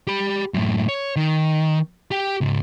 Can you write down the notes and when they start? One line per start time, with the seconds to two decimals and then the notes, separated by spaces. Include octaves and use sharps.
0.07 G4 B5
0.54 F#2 A2
0.89 C#5
1.16 D#3
2.11 G4 G5
2.41 C#2 G#2